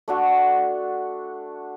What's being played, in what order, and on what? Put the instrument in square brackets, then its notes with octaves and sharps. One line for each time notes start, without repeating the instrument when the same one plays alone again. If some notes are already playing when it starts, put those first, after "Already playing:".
[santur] A3 D4 F#4 A4